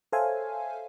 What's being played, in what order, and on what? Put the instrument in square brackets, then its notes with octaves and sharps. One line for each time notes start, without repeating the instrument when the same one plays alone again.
[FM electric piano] A4 C5 C#5 E5 F5 G#5